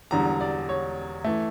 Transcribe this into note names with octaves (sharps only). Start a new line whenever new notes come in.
E1 E2 D3 G3 A#5
D5
C#5
E3 A3